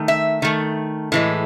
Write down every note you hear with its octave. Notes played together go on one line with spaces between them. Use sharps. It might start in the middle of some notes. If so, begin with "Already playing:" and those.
Already playing: D#3 A3
E5
D#3 A3
A2 E3 G#3